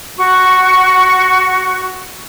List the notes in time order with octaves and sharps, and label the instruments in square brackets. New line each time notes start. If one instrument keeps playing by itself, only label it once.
[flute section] F#4 C#6